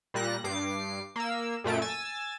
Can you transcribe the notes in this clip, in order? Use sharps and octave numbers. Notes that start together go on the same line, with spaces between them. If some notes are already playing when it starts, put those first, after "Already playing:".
A#2 G3 F#6 A#6
G2 D6 C7
A#3 E6
F#2 A#2 A3 D7
G#5 E6 A6